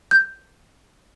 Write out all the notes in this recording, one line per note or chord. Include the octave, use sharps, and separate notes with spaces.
G6